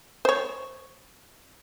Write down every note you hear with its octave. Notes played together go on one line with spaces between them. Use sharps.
C5 C#5